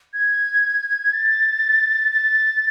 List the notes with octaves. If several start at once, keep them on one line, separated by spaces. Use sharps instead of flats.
G#6
A6
A6